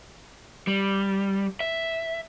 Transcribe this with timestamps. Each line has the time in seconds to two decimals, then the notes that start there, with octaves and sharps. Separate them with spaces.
0.67 G3
1.60 E5